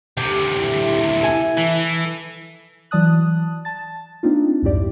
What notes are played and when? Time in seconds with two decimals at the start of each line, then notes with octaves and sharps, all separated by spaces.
0.17 D2 C3 G4
0.61 E4
1.20 A4 G#5
1.58 E3
2.91 E3 F#3 D5 A5 D#6 F#6
3.65 A5 A6
4.23 A#3 C4 D4 D#4 F4
4.62 C2 F2 G#2 E4 G4 D5